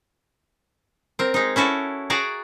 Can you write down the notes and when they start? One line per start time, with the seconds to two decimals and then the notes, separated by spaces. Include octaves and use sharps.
1.19 C4 A#4
1.34 G#3 D#4
1.56 C#4 E4 F#4 A4
2.10 F#4 G#4 D5 A#5